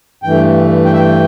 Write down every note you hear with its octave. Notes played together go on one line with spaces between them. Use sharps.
G2 E3 A3 G5
G5
E5
G5